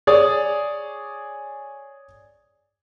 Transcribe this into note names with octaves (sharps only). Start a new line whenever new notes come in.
G#4 C#5 D5 G#5 D#6